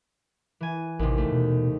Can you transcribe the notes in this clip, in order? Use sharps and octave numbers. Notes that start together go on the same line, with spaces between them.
E3 G#5
A1 D#2 C3
A3
B2